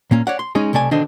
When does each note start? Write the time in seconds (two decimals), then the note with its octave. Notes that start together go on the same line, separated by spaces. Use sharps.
0.11 A#2 A#3 C#4
0.27 C#5 D5 F#5
0.39 C6
0.55 G#3 C#4 D#4 G#4
0.73 B1 C3 A3 D5 G#5
0.91 B2 D3 D#3 D4 C5 D#5